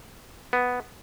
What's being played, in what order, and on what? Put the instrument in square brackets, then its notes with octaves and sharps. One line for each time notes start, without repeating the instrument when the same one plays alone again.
[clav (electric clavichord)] B3